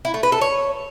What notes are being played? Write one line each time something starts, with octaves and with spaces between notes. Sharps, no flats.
E4
A3
B4
A4
C#5